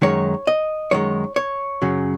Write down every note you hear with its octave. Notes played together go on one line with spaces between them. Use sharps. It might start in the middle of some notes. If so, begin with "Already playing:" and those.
F#2 D#3 G#3 C#5
D#5
F#2 D#3 G#3 C#5
C#5
F#2 C#3 F#3